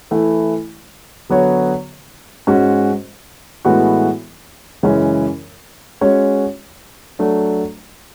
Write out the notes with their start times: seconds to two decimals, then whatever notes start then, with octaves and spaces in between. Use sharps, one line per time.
0.11 E3 A3 E4
1.29 D3 F#3 B3 F#4 C#5
2.47 G#2 G#3 C#4 F#4
3.65 A2 E3 G#3 B3 F#4
4.83 F#2 C#3 E3 G#3 C#4
6.01 G#3 C#4 F#4 C#5
7.19 F#3 A3 D4